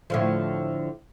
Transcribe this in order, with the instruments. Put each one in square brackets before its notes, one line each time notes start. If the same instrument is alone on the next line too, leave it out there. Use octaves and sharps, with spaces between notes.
[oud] A2 D3 F3